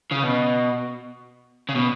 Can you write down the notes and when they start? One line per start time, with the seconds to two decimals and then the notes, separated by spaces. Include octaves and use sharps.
0.11 C#3
0.23 B2
1.69 C#3
1.75 B2